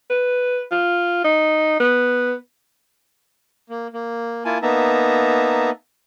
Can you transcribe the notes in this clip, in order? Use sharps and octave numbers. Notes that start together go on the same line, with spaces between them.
B4
F4
D#4
B3
A#3
A#3
A#3 E4 F4 G#5 A5
A#3 B3 D#4 E5 A5 A#5